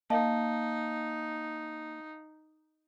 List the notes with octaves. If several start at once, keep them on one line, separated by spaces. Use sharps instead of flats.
A#3 D#4 D#5 F5 A5